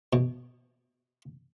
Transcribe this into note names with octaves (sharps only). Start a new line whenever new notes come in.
B2